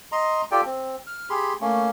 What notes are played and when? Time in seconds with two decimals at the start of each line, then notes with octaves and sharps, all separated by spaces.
0.12 D#5 A#5 C6
0.51 F4 G4 A4 D5 G5
0.66 C4
1.07 F6
1.30 G4 G#4 B5 C6
1.61 A3 A#3 C#4